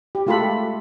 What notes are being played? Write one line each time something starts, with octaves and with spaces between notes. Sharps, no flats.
G4
G#3 A3 F4 G4 A4 B5